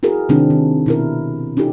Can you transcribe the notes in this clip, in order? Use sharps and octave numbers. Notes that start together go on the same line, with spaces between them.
E4 F#4 G#4 A#4
C3 D#3 G#3 C4 D4 E4
D#3
B2 E4 A#4
C#4 D#4 F4 G4 A4